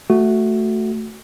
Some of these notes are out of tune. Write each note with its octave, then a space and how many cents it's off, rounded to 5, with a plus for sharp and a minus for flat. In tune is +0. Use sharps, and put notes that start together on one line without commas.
A3 +0 F#4 +0